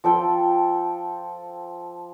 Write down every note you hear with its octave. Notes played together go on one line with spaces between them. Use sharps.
F3 A4 G5